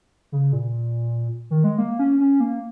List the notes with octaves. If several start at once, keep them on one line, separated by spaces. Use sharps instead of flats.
C#3
A#2
D#3
G#3
A#3
C#4
C#4
A#3